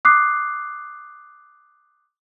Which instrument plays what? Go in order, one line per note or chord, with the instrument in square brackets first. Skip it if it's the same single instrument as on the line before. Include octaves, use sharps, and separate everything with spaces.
[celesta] D6 D#6 F#6 C7